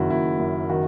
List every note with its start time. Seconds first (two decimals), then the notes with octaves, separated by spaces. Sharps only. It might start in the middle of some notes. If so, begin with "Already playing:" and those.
Already playing: F#1 D#3 E4 F#4
0.10 F#1 E4
0.39 F#2
0.69 D#3 F#4